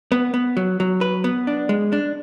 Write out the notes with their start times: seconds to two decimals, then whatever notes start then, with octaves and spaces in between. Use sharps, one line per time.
0.12 B3
0.34 B3
0.57 F#3
0.80 F#3
1.01 B4
1.24 B3
1.47 D4
1.69 G#3
1.93 D4